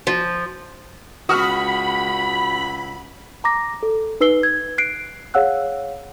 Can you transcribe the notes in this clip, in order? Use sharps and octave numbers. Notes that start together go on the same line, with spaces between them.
F3
C#2 F#4 B5 D#6 F6
A#5 D6 A#6
A4
D#4 B4 E6 C7 G7
G#6
F#6 C7 D7
G#4 C#5 F5 F#5 E6 F#6